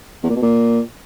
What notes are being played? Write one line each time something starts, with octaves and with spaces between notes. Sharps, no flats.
E2
A#2
B2
A#2